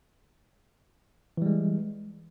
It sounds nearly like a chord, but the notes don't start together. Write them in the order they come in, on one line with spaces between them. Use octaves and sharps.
E3 G3 G#3